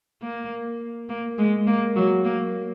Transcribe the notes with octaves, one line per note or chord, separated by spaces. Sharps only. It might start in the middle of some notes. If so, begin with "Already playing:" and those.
A#3
A#3
G#3
A#3
F#3
A#3